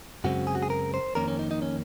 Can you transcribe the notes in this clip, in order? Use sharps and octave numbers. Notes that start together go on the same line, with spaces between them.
F#2 C#3 G#3 C4 F#4
G#4
F#4
G#4
A#4
C5
F2 D#3 A#3 C#4 A#4
C#4
D#4
D#4
C#4